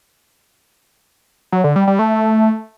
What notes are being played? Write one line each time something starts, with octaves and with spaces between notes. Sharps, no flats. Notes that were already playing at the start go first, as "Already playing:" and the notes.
F#3
D3
G3
G3
A3